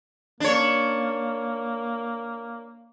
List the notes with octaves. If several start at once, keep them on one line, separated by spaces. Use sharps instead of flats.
A#3 D4 C#5